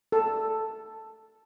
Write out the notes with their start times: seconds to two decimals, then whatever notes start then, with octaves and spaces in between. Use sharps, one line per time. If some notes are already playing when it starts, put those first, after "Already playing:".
0.12 A4